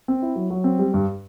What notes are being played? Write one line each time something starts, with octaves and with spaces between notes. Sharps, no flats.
C4
E4
F#3
F#3
C4
G3
G2